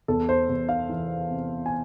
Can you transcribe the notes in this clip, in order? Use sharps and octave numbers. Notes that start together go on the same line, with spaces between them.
E2 A4
C5
E2
F5
E3
C3
G#5